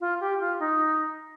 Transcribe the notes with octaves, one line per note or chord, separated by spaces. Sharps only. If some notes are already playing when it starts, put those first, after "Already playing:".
F4
G4
F4
D#4